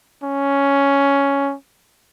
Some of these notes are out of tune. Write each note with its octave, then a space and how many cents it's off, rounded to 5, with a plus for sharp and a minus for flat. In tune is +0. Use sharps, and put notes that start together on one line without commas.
C#4 +5